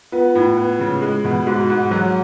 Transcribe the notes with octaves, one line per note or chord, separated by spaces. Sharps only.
B3 F4
A2 F4
B3
C#3
G#3
B2
G#2 F#4
G#2
F#3